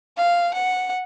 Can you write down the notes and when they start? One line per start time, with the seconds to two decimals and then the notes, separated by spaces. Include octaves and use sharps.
0.17 F5
0.54 F#5